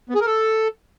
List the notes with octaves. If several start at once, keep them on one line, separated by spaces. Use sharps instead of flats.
B3
G#4
A#4
A4